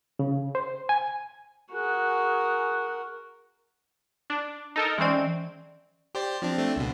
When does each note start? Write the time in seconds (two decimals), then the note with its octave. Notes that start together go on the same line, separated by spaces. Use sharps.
0.19 C#3
0.55 C5
0.89 G#5
1.72 F#4 G#4 A#4 G#5 F#6
4.30 D4
4.76 D#4 A4 A#4
4.98 E3 G#3 C4 C#4 D5
6.15 G4 C5 D5
6.42 F3 C4 D4
6.58 A3 C4 D4
6.76 C#2 B2